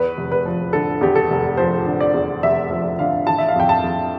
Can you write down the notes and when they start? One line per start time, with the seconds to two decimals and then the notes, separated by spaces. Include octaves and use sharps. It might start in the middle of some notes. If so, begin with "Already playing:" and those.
Already playing: E2 B4
0.17 F1
0.32 B4
0.46 F3
0.73 D3 A4
1.01 E2 G4
1.15 A4
1.30 F1
1.57 F3 C5
1.86 D3
2.00 D5
2.14 E2
2.43 F1 E5
2.70 F3
2.99 D3 F5
3.26 E3 A5
3.38 E5
3.48 F5
3.56 F2 G5
3.69 A5
3.84 F2